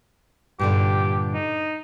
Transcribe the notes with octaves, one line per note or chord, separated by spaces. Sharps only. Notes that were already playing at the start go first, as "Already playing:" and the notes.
G2 A#2 D3 G4
D#4